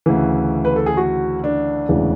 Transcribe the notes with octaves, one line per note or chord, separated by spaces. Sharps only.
D2 C#3 E3
B4
A4
G#4
F#4
D4
E1 D2 C#3 E3